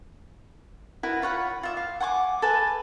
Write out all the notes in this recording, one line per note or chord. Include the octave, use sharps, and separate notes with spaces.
E4 F#4 A#4 B4
F4 C#5 F#5 B5
F4 E5 D6
F5
F#5 G#5 C6 D6
A4 B4 G#5 A5